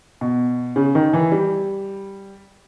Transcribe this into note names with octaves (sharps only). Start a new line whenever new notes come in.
B2
C#3
D#3
E3
G3